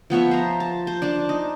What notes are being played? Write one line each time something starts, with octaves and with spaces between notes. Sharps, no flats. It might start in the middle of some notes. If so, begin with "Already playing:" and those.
F3 B3 C#5 E5
C5 A#5
A5
C5
D4 D5 A5
D#4